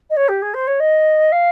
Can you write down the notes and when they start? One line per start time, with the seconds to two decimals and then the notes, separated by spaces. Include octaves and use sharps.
0.10 D#5
0.16 C#5
0.28 G4
0.42 G#4
0.54 C5
0.67 C#5
0.80 D#5
1.32 F5